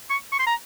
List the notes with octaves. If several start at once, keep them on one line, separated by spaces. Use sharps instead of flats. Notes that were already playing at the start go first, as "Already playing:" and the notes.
C#6
C#6
C6
A#5